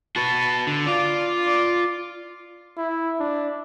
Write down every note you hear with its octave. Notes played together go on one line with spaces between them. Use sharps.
F#4 B4 A5
D3
F4 D5
D5
E4
D4